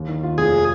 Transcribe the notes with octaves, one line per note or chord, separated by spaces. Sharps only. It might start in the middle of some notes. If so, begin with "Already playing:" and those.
Already playing: D#2
D#3
F4
F1 G#4